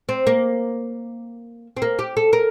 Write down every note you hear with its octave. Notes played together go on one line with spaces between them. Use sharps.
C4
A#3
C4
A#3
G4
A4
A#4